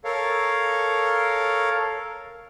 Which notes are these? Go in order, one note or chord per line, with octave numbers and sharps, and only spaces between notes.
A4 A#4 C#5 F5